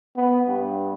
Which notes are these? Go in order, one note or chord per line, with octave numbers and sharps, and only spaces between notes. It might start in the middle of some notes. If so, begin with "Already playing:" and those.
B3
G2